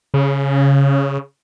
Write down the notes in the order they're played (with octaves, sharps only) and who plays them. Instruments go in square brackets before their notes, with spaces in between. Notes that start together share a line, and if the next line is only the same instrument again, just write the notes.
[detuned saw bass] C#3